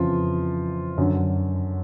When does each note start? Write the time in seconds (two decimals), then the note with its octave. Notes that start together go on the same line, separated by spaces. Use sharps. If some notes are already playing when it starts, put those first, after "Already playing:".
Already playing: F2 C#3 E3 F3 F4
0.98 F#2 D3